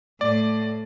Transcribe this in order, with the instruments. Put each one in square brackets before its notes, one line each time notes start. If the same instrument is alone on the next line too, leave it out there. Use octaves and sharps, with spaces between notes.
[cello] A2 [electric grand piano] D5